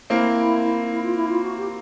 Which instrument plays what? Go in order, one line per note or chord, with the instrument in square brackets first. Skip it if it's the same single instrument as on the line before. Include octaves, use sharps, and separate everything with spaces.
[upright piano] A#3 C4 [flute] E4
[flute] E4
F4
E4
F4
F#4
G4